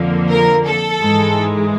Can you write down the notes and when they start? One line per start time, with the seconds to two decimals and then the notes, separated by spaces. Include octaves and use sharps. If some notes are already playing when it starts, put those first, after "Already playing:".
Already playing: F2 D3 F3 A#3
0.29 A#4
0.65 A4
1.00 G#2 E3 G#3